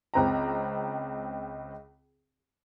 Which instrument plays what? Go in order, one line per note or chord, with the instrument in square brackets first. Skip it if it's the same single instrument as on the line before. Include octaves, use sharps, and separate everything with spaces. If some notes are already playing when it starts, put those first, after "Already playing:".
[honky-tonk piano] C#2 C4 A#5